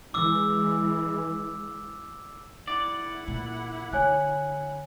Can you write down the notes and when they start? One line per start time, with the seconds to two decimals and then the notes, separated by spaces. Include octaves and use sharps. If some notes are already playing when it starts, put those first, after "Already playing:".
0.14 E3 G#3 D6 E6
2.68 E4 D5 F#5
3.28 A#2
3.93 D3 C#5 G#5 F#6